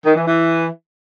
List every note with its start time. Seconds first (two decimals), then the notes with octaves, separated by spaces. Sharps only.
0.06 D#3
0.16 E3
0.26 E3